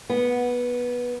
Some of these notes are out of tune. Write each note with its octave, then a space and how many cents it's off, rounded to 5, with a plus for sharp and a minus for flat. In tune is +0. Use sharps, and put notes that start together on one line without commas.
B3 -15